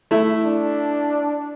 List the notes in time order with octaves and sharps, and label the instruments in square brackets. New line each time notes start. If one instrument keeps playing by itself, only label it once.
[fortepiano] A3 E4
[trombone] D4